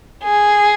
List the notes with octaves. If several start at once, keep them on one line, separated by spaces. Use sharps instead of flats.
G#4